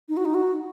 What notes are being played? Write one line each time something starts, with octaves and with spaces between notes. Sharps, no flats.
D#4
F#4
D#4
F#4